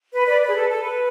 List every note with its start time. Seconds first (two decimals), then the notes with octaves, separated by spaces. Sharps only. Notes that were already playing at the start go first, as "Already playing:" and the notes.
0.13 B4
0.27 B4 D5
0.42 B4
0.48 G#4
0.55 A4
0.69 A4
0.82 B4